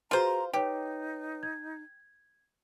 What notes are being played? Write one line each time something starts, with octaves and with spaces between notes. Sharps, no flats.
F4 F#4 G#4 B4 C5 A#5
D#4 G4 B4 C#5
G#6